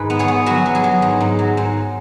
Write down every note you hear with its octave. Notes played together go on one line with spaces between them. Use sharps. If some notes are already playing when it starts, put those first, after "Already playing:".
Already playing: G#2 B4
B3
G#4 C#5
B3
F#3 F#4 B4
F#3
G#4
F#3
G#2
G#2
F#3
G#2